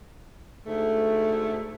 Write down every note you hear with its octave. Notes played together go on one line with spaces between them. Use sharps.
D2 G#2 A3